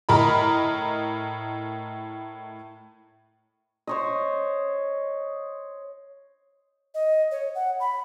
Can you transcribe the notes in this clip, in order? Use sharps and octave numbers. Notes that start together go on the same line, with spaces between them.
A2 A#4 D#5 B5
C5 C#5 D#5
D#5
C#5
F#5
B5